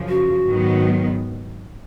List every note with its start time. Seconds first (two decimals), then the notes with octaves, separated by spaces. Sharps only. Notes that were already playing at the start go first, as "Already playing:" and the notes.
Already playing: F#2 C#3 F3
0.09 F#4
0.46 G#2 D#3 F#3 B3